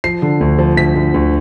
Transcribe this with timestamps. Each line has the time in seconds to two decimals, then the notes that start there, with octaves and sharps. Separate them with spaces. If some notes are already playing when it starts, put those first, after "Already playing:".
0.04 F3 C7
0.22 D3
0.41 D2
0.59 F3
0.77 D2 B6
0.95 D2
1.14 D2